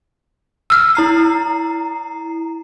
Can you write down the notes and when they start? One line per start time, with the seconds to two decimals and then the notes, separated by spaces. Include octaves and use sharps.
0.70 E6 F6
0.95 E4 A#5 C7